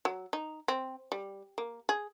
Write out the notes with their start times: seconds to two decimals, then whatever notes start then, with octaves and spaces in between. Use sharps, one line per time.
0.05 F#3
0.33 D#4
0.68 C4
1.12 G3
1.58 A#3
1.89 G#4